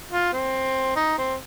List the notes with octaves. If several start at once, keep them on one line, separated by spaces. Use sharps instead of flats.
F4
C4
D#4
C4